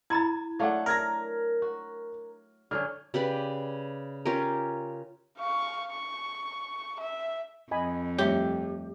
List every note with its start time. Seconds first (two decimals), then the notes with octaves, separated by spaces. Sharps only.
0.10 E4 A#5 B5 G#6 A6
0.59 F#3 A3 D4 F5 F#5
0.86 A#4 F6 G#6 A#6
1.62 F#4
2.71 D3 F#3 C#4 F6
3.14 C#3 G4 B4 D5
4.25 C#4 F4 G4 A#4
5.38 F5 C#6
5.91 C#6
7.00 E5
7.71 F2 D#5 G#5 B5
8.18 G3 A3 G4 C#5 E5 G5